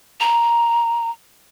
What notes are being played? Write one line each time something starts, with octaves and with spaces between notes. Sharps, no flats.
A#5